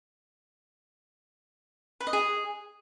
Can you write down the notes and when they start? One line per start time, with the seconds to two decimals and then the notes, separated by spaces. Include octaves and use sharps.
2.00 B4
2.07 D#5
2.13 G#4